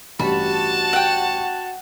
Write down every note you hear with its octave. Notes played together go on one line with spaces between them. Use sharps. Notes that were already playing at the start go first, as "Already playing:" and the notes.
A1 G2 G3 F#4 A5 B5
F#5 G5